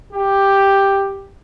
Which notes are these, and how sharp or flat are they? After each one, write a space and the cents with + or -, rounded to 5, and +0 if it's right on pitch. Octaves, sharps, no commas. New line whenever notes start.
G4 +5